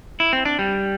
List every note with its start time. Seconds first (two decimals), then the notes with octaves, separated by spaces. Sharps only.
0.20 E4
0.33 C4
0.45 D4
0.59 G3